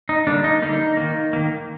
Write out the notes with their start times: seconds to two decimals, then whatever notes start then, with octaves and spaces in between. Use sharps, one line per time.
0.09 D#4
0.27 D3 G3 A#3 D4
0.44 D#4
0.62 D3 G3 A#3 D#4
0.97 D#3 A#3
1.33 D#3 A#3